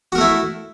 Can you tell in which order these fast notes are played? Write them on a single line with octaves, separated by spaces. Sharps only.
F#4 A#4 A3 E4